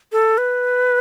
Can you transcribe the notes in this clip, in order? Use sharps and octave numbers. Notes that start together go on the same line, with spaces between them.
A4
B4